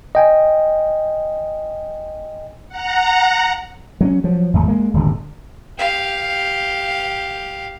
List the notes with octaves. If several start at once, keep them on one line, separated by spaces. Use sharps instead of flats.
D#5 G5 G#5
F#5 A#5
F#3 C4 C#4
F3 F#3
G#1 E2 A3
G#3 A#3
D#1 G#1 G2 D3
G4 F5